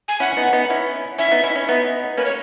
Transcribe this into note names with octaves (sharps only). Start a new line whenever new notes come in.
G#5
C#4 E4 F#5
B3 D#4
B3 D#4
C#4 E4
C#4 E4 E5
B3 D#4
C#4 E4
C#4 E4
B3 D#4
A#3 C#4 B4
C#5